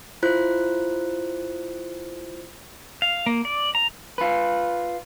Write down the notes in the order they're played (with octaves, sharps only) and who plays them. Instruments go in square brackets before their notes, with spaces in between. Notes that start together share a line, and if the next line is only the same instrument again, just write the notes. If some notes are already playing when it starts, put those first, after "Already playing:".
[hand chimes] E4 F4 C5 F#6
[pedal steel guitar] F5
A#3
D5
A#5
[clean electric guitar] F4 B4